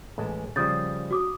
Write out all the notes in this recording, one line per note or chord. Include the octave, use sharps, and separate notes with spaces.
A1 G#3 A5
C#3 F3 G3 D#6 G6 A6
F#4 D6 D#6